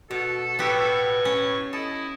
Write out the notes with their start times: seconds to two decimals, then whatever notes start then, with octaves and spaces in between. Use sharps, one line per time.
0.11 B2 F#4 A4
0.59 A2 B3 F#4 G4 B4 C#6
1.25 C#4
1.73 E4 A4 D#5